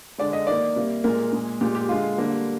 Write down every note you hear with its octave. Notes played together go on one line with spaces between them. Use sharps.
D3 G#3 D5
D#5
D#3 A#3 D5
C3 G3 A#3
A#2 G#3 A#4
A#2 G#3
A#2 G#3 G4
G4
D3 G#3 F4
D3 G3 A#3